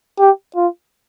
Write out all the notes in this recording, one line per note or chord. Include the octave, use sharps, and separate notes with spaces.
G4
F4